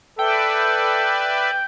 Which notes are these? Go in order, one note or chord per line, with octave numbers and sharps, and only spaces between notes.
A4 B4 D5 E5 G5